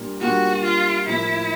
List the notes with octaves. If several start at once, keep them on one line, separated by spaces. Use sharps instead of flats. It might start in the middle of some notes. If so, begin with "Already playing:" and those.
Already playing: A#2 G3 A#3 D4
A#2 G3 A#3 D4 F#4
F4
A2 F3 A#3 E4